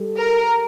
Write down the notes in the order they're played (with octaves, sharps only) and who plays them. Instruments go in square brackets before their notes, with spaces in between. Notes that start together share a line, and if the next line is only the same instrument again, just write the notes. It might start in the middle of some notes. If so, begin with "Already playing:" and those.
Already playing: [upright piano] G3 A4
[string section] A#4